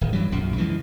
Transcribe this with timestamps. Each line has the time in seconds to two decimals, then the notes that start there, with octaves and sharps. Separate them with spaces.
0.01 D1 D#3
0.13 G2 E3 F#3 G3
0.32 B1 F#2 A#2
0.56 C#3 E3 F3 G#3